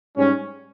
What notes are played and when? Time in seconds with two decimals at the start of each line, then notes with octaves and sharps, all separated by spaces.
0.15 G#2 G3 C#4